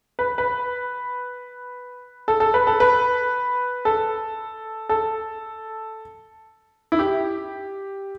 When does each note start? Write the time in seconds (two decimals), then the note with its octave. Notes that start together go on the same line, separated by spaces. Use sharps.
0.19 B4
0.38 B4
2.28 A4
2.40 A4
2.54 B4
2.67 A4
2.80 B4
3.85 A4
4.89 A4
6.92 E4
6.99 G4